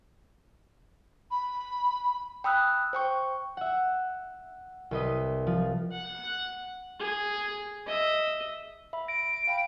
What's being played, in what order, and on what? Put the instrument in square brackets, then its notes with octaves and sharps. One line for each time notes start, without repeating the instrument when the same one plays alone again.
[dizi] B5
[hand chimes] G5 B5 D#6 E6 F#6
C5 G5 C#6
[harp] E5 F#5
C2 B4 D#5
F3
[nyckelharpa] F#5
G#4
D#5 E5
[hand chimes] E5 B5
[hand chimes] A#6 [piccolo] D7
[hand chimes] F5 G5 B5